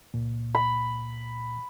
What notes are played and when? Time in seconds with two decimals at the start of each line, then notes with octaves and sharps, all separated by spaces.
0.14 C#2 A#2
0.55 B5